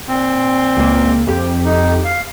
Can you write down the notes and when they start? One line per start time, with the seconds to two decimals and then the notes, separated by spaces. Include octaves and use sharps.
0.08 A#2 C4
0.77 C#2 A#3
1.27 F2 G4
1.65 D#4
2.05 F5